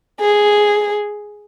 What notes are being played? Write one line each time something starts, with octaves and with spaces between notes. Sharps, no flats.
G#4